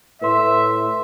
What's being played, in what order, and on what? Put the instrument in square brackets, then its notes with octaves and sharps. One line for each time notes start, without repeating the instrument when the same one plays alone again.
[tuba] A2 [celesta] B4 C6 [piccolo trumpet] E5